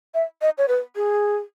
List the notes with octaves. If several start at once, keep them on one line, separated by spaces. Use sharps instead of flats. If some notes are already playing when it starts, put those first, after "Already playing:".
E5
D#5
C#5
B4
G#4